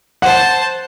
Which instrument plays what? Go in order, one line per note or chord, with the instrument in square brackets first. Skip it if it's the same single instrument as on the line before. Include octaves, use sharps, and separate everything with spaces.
[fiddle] C5 A5 [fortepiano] F#5